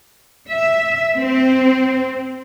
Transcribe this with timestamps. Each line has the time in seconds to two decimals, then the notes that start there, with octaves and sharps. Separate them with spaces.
0.51 E5
1.17 C4